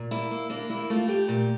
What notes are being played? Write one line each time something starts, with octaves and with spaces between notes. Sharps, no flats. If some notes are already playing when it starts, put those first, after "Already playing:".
Already playing: A#2
A#3 E4
A#3
A#3 D4
A#3 E4
A3 F4
A3 G4
A#2